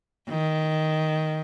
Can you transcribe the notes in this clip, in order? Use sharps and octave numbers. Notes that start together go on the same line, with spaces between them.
D#3